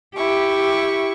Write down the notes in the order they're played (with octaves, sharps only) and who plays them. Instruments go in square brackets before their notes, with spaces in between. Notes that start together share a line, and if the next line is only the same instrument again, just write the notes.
[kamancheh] E4 C#6 [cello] G4